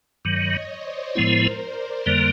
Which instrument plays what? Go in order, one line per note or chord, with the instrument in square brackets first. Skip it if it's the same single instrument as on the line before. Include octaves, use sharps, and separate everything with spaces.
[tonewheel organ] G2 D#3 F#3 [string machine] C#5 D#5
[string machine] C5 D5
[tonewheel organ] A2 F3 G#3 B3 E4 [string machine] A#4 C5
[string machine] C5 D5
[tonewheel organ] F2 D3 G3 A#3